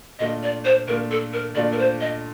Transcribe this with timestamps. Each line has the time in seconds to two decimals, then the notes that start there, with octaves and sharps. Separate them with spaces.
0.19 A#2 A3 D4 F4 D#5
0.43 D5
0.65 C5
0.88 A#2 A3 D4 F4 A#4
1.11 A4
1.33 A#4
1.55 A#2 A3 D4 F4 D5
1.72 A#4
1.79 C5
2.01 D#5